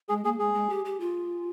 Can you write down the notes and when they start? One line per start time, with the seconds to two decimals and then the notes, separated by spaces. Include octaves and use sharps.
0.09 G#3 G#4
0.24 A#3 G#4
0.39 G#3 G#4
0.54 G#3
0.69 G4
0.85 G4
1.00 F4